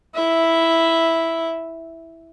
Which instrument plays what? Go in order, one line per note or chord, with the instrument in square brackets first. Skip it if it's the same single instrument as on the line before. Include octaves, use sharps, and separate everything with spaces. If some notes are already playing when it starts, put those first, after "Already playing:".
[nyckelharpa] E4 E5